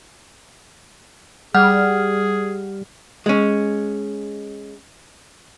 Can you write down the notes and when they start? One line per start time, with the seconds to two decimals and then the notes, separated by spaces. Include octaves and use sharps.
1.55 G3 G#4 F#5 F6
3.26 G#3 C#4